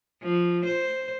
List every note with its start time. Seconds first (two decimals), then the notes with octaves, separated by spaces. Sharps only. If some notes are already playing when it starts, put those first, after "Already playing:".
0.23 F3
0.65 C5